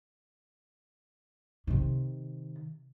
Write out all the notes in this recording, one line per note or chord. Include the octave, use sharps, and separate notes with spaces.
C3 D#3